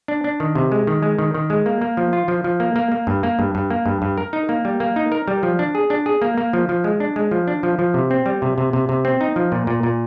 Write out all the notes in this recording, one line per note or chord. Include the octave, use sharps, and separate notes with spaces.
D4
D4
D#3
C3
G#3
D#3
G#3
D#3
D#3
G#3
A#3
A#3
F3
F4
F3
F3
A#3
A#3
A#3
G2
A#3
G2
G2
A#3
G2
G2
A#4
D#4
A#3
G3
A#3
D#4
A#4
G3
F3
D4
G#4
D4
G#4
A#3
A#3
F3
F3
G#3
D4
G#3
F3
D4
F3
F3
C3
C4
G3
C3
C3
C3
C3
C4
D#4
F3
A#2
A#2
A#2